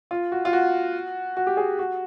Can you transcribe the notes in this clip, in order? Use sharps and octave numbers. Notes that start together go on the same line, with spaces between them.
F4
F#4
F4
F#4
F#4
G4
G#4
F#4